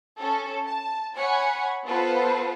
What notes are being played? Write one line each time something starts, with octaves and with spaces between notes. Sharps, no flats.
C#4 A4
A5
C#5 F#5 G#5 B5
B3 F4 A4 B4 C5